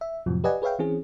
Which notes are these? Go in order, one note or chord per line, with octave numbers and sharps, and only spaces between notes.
E5
F2 A2 C3 F3 F#3
G4 B4 D5 D#5 F#5 G#5
G#4 B4 C#5 E5 F5 G5
E3 C4 C#4 G#4